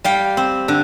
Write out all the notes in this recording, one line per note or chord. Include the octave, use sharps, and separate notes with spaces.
G3 F5 G5
C4
D3